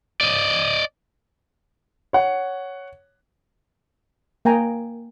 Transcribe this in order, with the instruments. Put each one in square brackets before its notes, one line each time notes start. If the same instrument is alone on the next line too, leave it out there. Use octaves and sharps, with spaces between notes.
[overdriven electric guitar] D5 D#5
[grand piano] C#5 F#5
[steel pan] A#3 G5 G#5 A#5